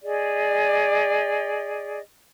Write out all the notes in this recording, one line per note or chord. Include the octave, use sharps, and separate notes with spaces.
G#4 D5 D#5